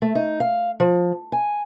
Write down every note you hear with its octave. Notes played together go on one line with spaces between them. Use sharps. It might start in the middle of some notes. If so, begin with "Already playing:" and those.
A3
D#4
F5
F3
G#5